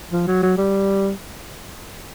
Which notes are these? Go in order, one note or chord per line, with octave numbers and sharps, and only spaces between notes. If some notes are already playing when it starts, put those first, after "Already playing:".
F3
F#3
F#3
G3